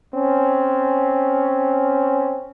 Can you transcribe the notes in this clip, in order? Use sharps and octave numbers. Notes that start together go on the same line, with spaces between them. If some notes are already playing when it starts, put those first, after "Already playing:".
C4 C#4